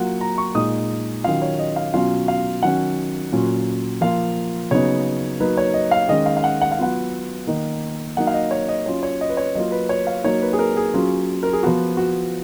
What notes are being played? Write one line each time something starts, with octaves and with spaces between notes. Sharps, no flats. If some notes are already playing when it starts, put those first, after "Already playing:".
Already playing: F#3 A#3 F4 F#5
A#5
C#6
A#2 G#3 D#4 D#6
D#3 F#3 C#4 F4 F5
C#5
D#5
F5
B2 F#3 C#4 F4 F5
F5
D#3 F#3 C#4 F#5
A#2 F#3 C#4 F4
F3 A#3 F4 F5
C#3 F#3 B3 D#4 C#5
F#3 A#3 D#4 B4
C#5
D#5
F5
D#3 G#3 C#4 D#5
F5
F5
F#5
F#5
F5
F#3 B3 F4 F#5
D#3 A#3 D#4
F#3 A#3 D#4 F#5
F5
D#5
C#5
D#5
F#3 C#4 F4 C#5
C#5
D#5
B4
C#5
F#3 A#3 F4 D#5
B4
C#5
F5
F#3 A#3 D#4 C#5
B4
G#4
A#4
G#4
F#3 C#4 F4
A#4
G#4
F3 B3 F4 F#4
F#4